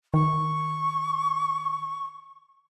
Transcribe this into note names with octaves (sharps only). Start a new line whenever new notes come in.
D#3 C#6